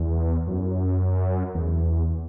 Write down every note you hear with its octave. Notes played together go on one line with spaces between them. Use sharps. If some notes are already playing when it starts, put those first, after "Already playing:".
Already playing: E2
F#2
E2